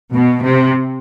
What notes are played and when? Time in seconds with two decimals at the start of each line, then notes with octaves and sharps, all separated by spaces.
0.14 B2
0.43 C3